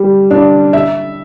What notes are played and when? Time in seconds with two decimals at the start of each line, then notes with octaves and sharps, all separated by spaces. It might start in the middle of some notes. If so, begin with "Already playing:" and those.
Already playing: G3
0.31 D4
0.73 E5